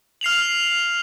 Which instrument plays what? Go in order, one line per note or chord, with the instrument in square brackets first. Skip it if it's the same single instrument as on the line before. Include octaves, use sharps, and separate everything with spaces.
[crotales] F6 C7 F7 F#7